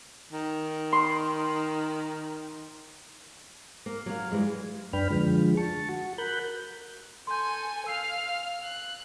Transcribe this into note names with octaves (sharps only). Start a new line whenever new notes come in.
D#3
C6
A#3
F#3 F5
E3 G3 G#3
F#2 D4 B4 G5 B5 F6
D3 F3 G#3
A5 C#6
F#4
A#4 B5 F#6 G6
A4 G#5 C6 G6
F5 E6 F6 C7
F#6